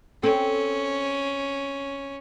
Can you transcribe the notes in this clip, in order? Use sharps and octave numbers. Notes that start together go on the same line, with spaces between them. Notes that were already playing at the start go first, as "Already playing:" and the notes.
C4 C#4 A4 G5